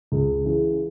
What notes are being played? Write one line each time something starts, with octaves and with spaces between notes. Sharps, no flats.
C#2
C#3 E3